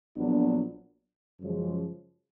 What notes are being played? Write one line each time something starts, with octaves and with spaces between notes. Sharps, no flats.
A#1 A#2 F#3 B3 D4
F#2 C#3 F3 G#3